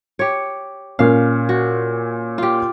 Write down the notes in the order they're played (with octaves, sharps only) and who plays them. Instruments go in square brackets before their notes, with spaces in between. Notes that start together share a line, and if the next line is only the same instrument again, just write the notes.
[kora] G4 C#5
[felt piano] A#2 C#4 [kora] F5
[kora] F#4
F4 G4